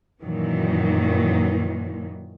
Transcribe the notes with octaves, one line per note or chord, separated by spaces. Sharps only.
F#2 A#2 D#3 E3 F#3